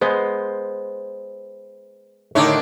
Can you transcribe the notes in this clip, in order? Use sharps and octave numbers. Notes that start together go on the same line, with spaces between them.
G#3 B3 C5
A2 D3 D#3 D4 D#4 C#5 E5 D6